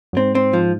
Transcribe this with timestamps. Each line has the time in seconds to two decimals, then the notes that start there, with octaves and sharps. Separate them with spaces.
0.13 F#2
0.17 G#2 C4
0.35 C4
0.53 F3